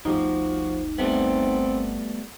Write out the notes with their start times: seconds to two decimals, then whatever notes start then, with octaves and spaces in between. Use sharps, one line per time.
0.05 G1 D2 F3 D#4 F#4 G4
0.98 G3 A3 B3 C4